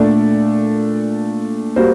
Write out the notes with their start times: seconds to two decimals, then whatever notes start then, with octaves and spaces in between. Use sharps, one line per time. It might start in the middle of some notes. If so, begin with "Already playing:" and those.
Already playing: A#2 A3 D4 A4 D5
1.76 G3 A#3 F#4 C5